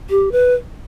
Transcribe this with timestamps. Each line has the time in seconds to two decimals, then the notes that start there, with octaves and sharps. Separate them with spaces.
0.10 G4
0.32 B4